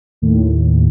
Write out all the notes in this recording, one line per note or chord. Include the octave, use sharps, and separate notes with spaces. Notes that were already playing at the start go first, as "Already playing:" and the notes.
D#2 A2